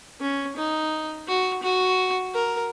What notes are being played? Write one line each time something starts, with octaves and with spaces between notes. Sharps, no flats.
C#4
D#4
F#4
F#4
A#4